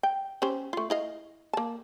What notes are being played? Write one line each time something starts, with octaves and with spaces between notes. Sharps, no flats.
G5
C#4 G4 C5
A3 F4
E4 D#5 F5
A#3 A5